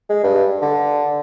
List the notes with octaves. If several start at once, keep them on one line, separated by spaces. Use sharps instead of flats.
G#3
G2
D3